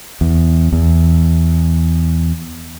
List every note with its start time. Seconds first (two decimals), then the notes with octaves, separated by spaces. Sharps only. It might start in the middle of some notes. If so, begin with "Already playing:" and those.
0.21 E2
0.73 E2